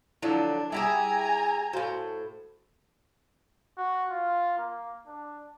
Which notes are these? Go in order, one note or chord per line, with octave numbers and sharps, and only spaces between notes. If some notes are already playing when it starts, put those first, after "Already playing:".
D3 F3 F#3 D4 E4 F4
G3 E4 G4 G#4 G#5 A#5
A2 F#4 C5 F5 C6
F#4
F4
A#3
D4